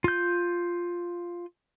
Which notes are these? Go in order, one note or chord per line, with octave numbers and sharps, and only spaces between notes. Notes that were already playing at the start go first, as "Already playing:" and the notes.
F4 G6